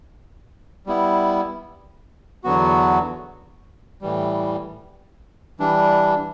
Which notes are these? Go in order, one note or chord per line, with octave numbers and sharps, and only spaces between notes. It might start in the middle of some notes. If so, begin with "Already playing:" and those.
G3 B3 E4
E2 D3 F#3 B3 F#4
A2 E3 G3
E3 G3 D4